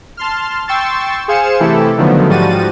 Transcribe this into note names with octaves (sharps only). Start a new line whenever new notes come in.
A5 C6 F6
G5 C6 C#6 E6 A6 E7
G#4 C5 F5 G#5 C#7 E7
C3 E3 A3 E4 G4 A4
D3 D#3 F3 F#3 A3 B3
G#2 F3 G3 F#4 A6 D#7